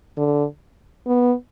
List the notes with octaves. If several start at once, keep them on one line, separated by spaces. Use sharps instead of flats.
D3
B3